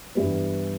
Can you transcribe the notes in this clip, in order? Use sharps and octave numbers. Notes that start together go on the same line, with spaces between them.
G2 E3 G3 B3